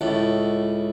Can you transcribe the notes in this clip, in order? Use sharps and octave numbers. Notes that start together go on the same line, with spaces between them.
C#2 A2